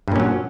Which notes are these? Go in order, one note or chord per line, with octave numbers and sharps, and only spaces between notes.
G2 A#2 F#3 C#4